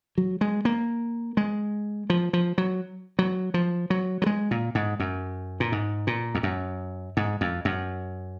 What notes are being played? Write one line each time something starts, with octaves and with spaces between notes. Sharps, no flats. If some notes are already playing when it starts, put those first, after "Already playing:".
F#3
G#3
A#3
G#3
F3
F3
F#3
F#3
F3
F#3
F#3
G#3
A#2
G#2
F#2
A#2
G#2
A#2
F2
F#2
G#2
F2
F#2